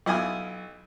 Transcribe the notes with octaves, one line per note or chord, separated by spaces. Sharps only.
B1 E4 F4 G#5 D#6 F6